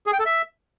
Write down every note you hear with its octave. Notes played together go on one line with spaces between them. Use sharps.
G#4
G5
A4
E5